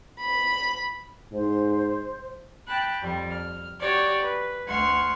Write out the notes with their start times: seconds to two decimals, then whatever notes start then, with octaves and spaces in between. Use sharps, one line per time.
0.19 B5
1.33 G#2 C5
2.66 G5 A5 B5 F#6
3.01 F2 G3
3.30 F6
3.79 F#4 G4 C#5 D5
4.20 B4
4.66 D2 F#5 C6 C#6 F6